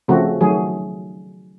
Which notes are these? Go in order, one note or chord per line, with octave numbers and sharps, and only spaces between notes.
C#3 F3 A3 C4 F#4
D#3 F#3 A3 G#4